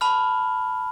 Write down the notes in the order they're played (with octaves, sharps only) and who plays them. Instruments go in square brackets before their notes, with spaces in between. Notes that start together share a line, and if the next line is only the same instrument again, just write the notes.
[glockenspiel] A5 B5 F6